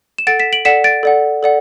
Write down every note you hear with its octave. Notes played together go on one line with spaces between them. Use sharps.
E7
A4 F#5 A6 D7
B6 E7
D7 F#7
A4 D5 F#5 B6 E7
A6 D7
A4 D5 F#5
A4 D5 F#5